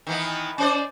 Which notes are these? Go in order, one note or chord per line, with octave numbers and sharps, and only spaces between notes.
D#3 E3 B3
C#4 C5 D5